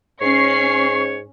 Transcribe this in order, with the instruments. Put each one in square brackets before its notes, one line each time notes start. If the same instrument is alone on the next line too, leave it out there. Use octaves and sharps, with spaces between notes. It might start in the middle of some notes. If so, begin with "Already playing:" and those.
[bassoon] G#2 [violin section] C#4 C7 [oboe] C#5 [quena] C#6